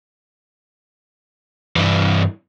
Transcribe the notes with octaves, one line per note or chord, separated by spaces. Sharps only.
G2 E3